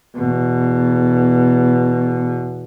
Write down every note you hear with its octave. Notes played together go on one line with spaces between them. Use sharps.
E2 B2